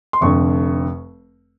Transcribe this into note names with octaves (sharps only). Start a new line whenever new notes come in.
C6
F1 F2 D3 C#6